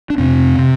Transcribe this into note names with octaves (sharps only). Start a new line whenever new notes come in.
D4
F2 C3 C4
C3